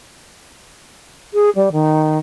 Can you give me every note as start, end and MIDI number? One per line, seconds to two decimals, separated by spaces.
1.34 1.50 68
1.55 1.69 55
1.72 2.18 51